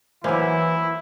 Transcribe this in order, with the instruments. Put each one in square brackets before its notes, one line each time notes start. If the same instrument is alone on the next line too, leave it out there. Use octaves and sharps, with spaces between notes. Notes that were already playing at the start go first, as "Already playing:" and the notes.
[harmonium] E3 [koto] F#3 A#3 [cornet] E4 [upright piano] C5 G#5 D6